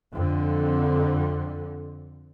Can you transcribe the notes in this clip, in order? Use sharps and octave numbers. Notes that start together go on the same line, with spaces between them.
F2 D3